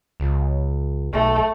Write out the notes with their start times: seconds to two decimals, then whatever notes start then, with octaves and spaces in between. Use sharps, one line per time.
0.20 C#2
1.13 B1 A3